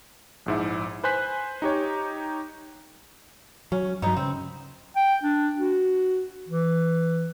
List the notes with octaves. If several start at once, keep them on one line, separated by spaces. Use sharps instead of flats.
A#1 G#2 E4
B4 C5 G#5 F#6 B6
D#4 G4 C#5
F#3 C#4
G2 F#3 B3 D#4
C#3 C4
G5
D4
F#4
E3